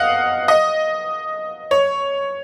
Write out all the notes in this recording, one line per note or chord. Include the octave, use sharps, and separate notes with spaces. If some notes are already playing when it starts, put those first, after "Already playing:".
Already playing: D#5 F5 F#5
D#5
C#5